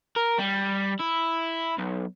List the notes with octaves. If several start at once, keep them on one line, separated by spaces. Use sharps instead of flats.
A#4
G3
E4
B1